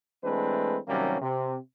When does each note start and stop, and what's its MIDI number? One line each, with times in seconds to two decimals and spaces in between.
0.24 0.78 52
0.24 0.78 56
0.24 0.78 57
0.24 0.78 60
0.24 0.78 62
0.24 0.78 71
0.88 1.21 48
0.88 1.21 51
0.88 1.21 54
0.88 1.21 55
0.88 1.21 58
0.88 1.21 61
1.21 1.57 48